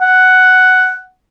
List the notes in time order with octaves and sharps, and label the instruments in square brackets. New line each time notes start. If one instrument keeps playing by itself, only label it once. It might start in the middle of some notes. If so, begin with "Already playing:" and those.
[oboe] F#5